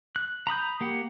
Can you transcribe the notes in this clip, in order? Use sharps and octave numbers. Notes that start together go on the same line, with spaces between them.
F#6
A#5 B5 D#6 G6
A#3 G4 F#5